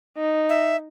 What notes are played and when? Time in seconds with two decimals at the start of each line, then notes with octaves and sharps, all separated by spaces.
0.18 D#4
0.49 E5